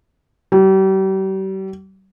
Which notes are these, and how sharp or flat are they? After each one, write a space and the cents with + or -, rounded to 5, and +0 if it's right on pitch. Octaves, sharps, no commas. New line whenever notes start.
G3 -40